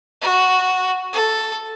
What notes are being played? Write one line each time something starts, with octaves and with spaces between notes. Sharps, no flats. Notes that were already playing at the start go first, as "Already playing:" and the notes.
F#4
A4